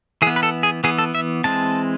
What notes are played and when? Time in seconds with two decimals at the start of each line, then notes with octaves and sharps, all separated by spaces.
0.22 E3 G#4
0.27 B3
0.36 B4
0.43 A4
0.63 G#4
0.84 E3 B3 G#4
0.98 A4
1.15 E5
1.44 E3 G#3 C4 A5